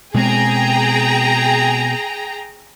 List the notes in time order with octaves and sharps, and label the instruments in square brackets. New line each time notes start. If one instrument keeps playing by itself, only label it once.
[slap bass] B2 G#3 C4 [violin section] G#4 G5 A#5